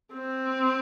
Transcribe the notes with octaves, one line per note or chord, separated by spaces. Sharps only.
C4